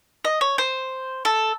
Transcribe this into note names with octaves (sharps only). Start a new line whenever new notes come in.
D#5
C#5
C5
A4